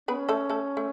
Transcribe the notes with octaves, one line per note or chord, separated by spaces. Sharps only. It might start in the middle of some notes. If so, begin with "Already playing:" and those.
B3 C#4 B4
A3 A4
A3 A4
A3